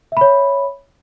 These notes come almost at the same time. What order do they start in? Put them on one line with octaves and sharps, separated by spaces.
E5 B5 C#5